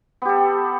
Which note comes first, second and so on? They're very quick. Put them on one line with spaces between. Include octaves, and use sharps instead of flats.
B3 G4 A4